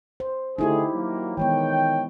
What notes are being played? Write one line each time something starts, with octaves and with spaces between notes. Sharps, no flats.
C5
D3 A3 D#4 E4 G4 G#4
F#3 A#3
D#3 E3 G#3 B3 C#5 G5